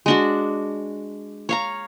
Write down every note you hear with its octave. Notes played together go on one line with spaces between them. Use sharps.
G#3 D4 F#4
C#5 F5 A#5